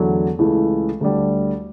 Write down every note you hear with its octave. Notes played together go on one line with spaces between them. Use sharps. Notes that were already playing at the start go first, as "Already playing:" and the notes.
Already playing: E2 D3 F#3 A3 E4
C#2 C#3 E3 A3 E4
D2 D3 G3